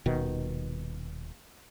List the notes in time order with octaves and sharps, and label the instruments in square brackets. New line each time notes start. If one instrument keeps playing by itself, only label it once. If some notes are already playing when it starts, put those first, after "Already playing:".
[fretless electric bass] D#1 B2 D#3